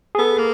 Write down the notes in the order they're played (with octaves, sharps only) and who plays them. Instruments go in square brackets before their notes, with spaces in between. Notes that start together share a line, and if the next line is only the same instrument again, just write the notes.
[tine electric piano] G#4
[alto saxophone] B3 [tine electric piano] A4
[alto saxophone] A#3